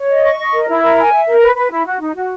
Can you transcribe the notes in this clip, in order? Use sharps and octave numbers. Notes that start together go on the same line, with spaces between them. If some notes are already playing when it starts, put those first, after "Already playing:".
Already playing: C#5
D#5
C#6
D#5
A#4
E4
A#4
G#5
E5
A#4
B4
B4
E4
F#4
D#4
F#4